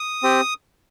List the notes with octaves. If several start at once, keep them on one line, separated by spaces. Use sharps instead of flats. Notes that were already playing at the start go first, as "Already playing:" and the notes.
Already playing: D#6
C4 G4